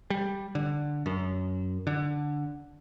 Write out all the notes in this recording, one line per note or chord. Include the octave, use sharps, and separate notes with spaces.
G3
D3
F#2
D3